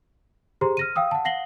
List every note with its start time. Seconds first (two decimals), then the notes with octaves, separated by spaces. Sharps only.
0.61 G4 G#4 C5 A#5 C6
0.77 F6 A#6 D#7
0.96 F5 G5 D#6 E6
1.11 F#5 A5
1.25 F5 F#5 A#6 C7 F#7 G7